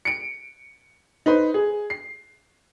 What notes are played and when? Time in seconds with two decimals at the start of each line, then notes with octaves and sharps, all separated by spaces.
0.05 C#7 D7
1.26 D#4 B4 C5
1.54 G#4
1.90 C7